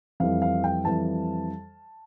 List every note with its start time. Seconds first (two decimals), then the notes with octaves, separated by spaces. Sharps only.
0.20 F2 E3 G3 F5
0.42 F5
0.64 G5
0.85 F2 E3 G3 A5